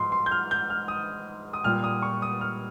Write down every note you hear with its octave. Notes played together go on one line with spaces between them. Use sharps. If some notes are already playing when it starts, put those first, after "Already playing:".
Already playing: G#2 F3 C6
C6
G6
F6
G6
F6
D#6
D#6
A#2 G3 F6
D#6
C#6
D#6
F6